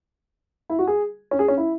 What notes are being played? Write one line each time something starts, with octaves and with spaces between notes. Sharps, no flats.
E4
F#4
G#4
C#4
G#4
C#4
E4